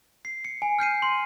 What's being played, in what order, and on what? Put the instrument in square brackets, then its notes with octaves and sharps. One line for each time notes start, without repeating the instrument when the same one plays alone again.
[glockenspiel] C7
C#7
G#5
F6 G6 C7 D#7
C6